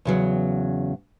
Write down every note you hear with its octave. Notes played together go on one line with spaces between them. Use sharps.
E2 C#3 F#3